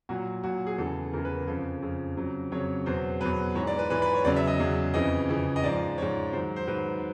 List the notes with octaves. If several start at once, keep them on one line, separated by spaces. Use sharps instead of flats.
A#2 F#3 F#4
A#2 F#3 F#4
G#4
E2 C#3 E3 A4
E2 C#3 E3 A#4
B4
A#4
F2 C#3 F3 A4
F2 C#3 F3
F2 C#3 F#3
F2 C#3 F#3 C#5
E2 B2 F#3 C5
E2 B2 F#3 B4
G#2 E3 C#5
D5
B4
G#2 E3 B4
B4
C#5
E2 C#3 F#3 D5
E5
D#5
E2 C#3 F#3
F2 C#3 E3 D#5
F2 C#3 E3
D#5
G#2 F3 D5
G#2 F3 C#5
G#2 D#3 F#3 C5
C5
G#2 D#3 F#3 B4